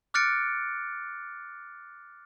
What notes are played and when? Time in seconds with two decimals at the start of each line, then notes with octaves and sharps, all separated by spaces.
0.14 D6 F6 F#6 A6 C#7 D7